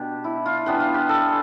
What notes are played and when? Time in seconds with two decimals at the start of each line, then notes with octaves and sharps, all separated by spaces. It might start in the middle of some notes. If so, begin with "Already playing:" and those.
Already playing: B2 D4 G4
0.24 E4
0.46 F4
0.66 E3 B3 D4 G4
0.80 F4
0.94 G4
1.09 A4